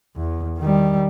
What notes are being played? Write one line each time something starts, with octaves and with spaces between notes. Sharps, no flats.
E2
D#3 G3